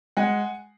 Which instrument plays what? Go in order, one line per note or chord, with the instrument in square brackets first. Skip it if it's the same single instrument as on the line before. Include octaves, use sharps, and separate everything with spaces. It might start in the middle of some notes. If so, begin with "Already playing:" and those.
[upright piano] G#3 F#5 G#5